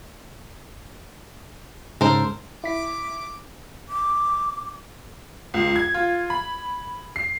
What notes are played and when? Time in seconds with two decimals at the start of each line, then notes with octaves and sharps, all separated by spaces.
2.01 G#2 C#3 A4 A#4 C5
2.64 E4 D6 B6
3.89 D6
5.54 C#2
5.76 G#6
5.94 F4
6.30 B5
7.16 C7